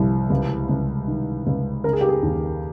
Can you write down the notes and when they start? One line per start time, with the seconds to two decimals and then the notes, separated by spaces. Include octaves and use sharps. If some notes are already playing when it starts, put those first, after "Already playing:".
Already playing: C2 F3
0.30 C#2
0.69 C#2
1.08 D#3
1.47 C#2
1.84 C#3 A#4
1.93 G#4
2.01 G4
2.09 G#4
2.23 D#2